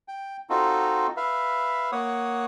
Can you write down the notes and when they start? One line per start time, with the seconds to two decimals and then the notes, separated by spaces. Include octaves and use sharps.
0.08 G5
0.50 C4 D#4 F4 F#4 A4
1.17 B4 E5 F5
1.92 A#3 C#5 F#5 D#6